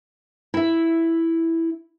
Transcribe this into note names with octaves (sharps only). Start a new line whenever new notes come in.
E4 E5